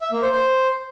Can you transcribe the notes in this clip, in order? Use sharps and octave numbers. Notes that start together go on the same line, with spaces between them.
E5
A#3
C5
C5